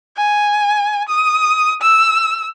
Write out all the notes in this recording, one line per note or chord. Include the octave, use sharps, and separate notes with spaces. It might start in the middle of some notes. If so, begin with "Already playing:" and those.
G#5
D#6
E6